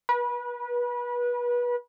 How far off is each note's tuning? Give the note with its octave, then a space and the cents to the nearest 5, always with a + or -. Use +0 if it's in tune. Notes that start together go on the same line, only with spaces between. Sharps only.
B4 -30